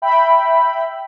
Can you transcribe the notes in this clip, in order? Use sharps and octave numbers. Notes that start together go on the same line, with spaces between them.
E5 G5 B5